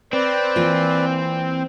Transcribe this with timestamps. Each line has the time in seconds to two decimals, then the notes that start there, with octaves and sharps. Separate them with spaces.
0.13 C4 B4 D5
0.56 E3 A#3 F4